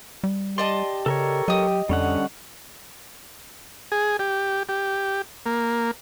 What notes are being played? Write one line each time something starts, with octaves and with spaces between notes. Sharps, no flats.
G3
G4 D5 D#5 A5 C6
C#3 A4 A#4 C#5
F#3 G4 D#5 D#6
F2 D3 G3 C#4 F#5
G#4
G4
G4
A#3